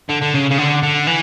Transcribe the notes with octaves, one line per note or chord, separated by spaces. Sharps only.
D3
D3
C#3
C#3
D3
D3
E3